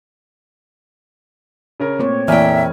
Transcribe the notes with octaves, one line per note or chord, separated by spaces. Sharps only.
C#3 C#4 A#4
A#2 A3 C4 C#5
F1 A#2 E3 E4 E5 G5 G#5 F6